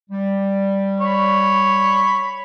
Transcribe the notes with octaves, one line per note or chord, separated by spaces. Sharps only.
G3
C#5 B5